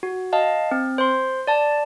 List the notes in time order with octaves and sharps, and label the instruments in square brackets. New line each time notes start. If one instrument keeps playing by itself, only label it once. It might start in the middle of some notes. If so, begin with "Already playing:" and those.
[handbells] F#4
D#5 F5 A5
C4
C5 C6
D5 A5